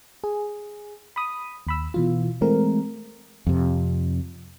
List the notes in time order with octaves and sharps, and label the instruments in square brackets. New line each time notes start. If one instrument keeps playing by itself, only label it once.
[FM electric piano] G#4
B5 D#6
D#2 B5 E6
B2 E3 F4
E3 G#3 A3 C4 A#4
[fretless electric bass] F2 C3